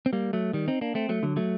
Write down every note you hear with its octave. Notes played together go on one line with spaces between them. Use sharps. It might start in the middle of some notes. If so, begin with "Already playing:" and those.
C4
G3 A#3
F#3 A3
D#3 G3
C4 D#4
A#3 D4
A3 C4
F#3 A3
D3 F#3
F#3 A3